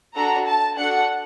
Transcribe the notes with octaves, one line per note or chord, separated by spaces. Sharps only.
D4 F#4 A4 A#5
A5
D4 F#4 A4 F#5